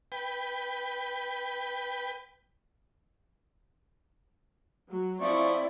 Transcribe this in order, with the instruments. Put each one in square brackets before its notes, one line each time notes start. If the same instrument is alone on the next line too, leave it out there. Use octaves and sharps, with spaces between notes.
[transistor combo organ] B4 G5
[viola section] F#3
[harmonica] F3 C#6 [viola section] C4 E4 [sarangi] D5 [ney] E5